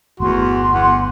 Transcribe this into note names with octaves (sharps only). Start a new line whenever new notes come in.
G1 E2 A3 F#4 C6
E2 F#5